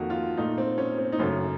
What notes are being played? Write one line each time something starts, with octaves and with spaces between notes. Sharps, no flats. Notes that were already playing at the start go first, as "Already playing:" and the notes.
Already playing: F2 D#3 A#3 F#4
F4
A#2 A3 D#4
C4
C#4
C4
D#4
F#2 C#3 A3 C#4